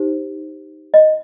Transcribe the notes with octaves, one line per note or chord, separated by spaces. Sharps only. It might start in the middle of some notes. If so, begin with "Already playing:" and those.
Already playing: D#4 G4 C5
D#5